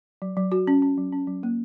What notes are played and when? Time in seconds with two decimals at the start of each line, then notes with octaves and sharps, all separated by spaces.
0.22 F#3
0.37 F#3
0.52 F#4
0.67 C#4
0.82 C#4
0.97 F#3
1.12 C#4
1.27 F#3
1.43 A#3